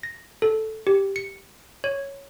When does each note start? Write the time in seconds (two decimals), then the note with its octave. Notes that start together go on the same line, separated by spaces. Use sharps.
0.03 A#6
0.42 A4
0.87 G4
1.16 C#7
1.84 C#5